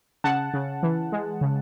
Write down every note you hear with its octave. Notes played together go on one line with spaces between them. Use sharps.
C#3 F#5 A5
C#3
E3
G#3
C#3